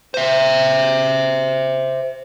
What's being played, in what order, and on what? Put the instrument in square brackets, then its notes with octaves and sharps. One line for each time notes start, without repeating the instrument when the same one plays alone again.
[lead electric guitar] C5 E5